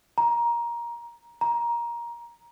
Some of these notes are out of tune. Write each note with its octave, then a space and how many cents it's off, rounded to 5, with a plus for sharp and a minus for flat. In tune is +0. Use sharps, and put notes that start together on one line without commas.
A#5 +15
A#5 +15